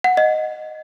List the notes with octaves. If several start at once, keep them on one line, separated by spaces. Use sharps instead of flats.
F#5
D#5